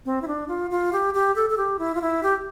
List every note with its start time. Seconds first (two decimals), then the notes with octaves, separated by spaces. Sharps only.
0.05 C4
0.22 E4
0.28 D4
0.48 F4
0.71 F4
0.93 G4
1.14 G4
1.36 A4
1.50 A4
1.57 G4
1.79 E4
1.95 F4
2.01 E4
2.23 G4